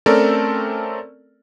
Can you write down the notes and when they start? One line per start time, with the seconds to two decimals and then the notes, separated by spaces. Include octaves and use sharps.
0.06 A3 C4 C#4 A4 A#4 D5